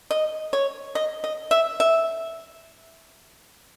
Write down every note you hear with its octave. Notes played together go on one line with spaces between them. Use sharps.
D#5
C#5
D#5
D#5
E5
E5